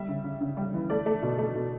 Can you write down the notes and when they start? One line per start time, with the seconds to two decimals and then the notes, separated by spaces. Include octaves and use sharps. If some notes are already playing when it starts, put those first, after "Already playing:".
Already playing: G3 E5
0.08 C#3
0.24 C#3
0.41 C#3
0.57 G3
0.74 E3
0.90 A3 D5
1.06 A3
1.22 B2
1.38 A3
1.55 B2